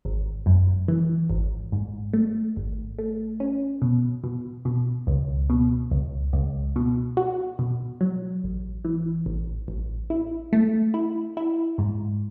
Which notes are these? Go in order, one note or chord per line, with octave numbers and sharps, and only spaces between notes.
G#1
F#2
E3
G#1
G#2
A3
G#1
A3
C#4
B2
B2
B2
C#2
B2
C#2
C#2
B2
F#4
B2
F#3
A1
E3
A1
A1
E4
A3
E4
E4
G#2